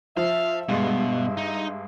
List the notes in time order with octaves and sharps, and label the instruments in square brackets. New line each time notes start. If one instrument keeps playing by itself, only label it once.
[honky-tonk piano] F3 [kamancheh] E5 [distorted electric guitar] F5
[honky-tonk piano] G2 G#3 [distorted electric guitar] B2 [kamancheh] E5
[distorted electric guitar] D#4